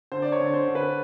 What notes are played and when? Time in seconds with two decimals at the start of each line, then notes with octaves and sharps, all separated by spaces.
0.12 D3 C5
0.22 D5
0.32 C#5
0.40 D3
0.54 C5
0.68 D3
0.75 B4